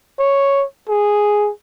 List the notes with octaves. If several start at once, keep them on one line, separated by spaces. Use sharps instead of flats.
C#5
G#4